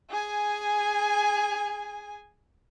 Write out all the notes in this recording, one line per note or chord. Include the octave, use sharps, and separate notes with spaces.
G#4 G#5